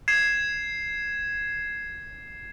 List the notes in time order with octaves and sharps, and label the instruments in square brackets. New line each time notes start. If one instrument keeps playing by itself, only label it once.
[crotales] G#6 C7 E7